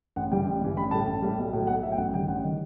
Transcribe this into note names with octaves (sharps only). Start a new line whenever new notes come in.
A1 F#5
G2 E3 G3 G5
A1
G2 E3 G3
A1 B5
A2 G3 A5
A1
A2 G3
B1
A2 F#3
B1 F#5
A2 F#3 E5
G5
A1 F#5
G2 D#3 G3 G5
A1 F#5
D#3 G3